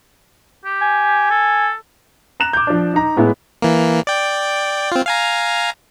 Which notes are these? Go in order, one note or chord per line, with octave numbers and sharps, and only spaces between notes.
G4
G#5
A4
A#5 F#6 E7 F7
D6 G6
F3 D4
D#4 A#5
A2 G#3 B3 E4 E5
E3 A#3
D5 G5
C4 F4
F5 G#5 A#5